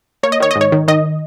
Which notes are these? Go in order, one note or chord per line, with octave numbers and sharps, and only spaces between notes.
A#3 C#5
D#5
D#3 C#5
D#5
G#2
C#5
D#3
D#3 D#5